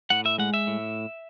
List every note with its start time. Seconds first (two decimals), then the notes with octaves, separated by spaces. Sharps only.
0.10 A2 F#5
0.26 E5
0.38 G#3 F#5
0.54 E5
0.67 A2